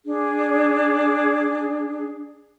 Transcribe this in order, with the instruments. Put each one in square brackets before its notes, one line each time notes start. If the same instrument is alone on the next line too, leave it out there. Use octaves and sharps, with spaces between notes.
[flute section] D4 G#4